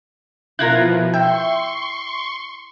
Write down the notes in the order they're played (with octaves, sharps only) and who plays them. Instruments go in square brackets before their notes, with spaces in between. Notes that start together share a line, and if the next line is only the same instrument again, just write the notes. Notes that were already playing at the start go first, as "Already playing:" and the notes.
[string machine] B2 F3 [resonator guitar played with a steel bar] E4 F4 A#4 [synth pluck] F#6 G#6 A#6
[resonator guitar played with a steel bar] E5 [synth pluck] G5 [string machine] C6 C#6